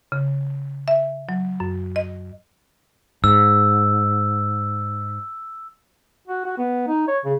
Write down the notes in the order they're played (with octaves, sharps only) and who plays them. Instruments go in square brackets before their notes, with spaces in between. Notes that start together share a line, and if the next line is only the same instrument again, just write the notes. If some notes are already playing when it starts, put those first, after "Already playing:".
[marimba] C#3
E5
F#3
F#2
D#5
[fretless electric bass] G#2 [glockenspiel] E6
[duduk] F#4
F#4
B3
D#4
C#5
C#3